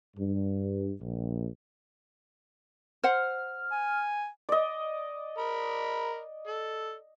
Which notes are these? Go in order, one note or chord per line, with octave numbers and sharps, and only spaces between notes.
G2
A#1
C5 F#5 F6
G#5
D5 D#5
A#4 B5
A4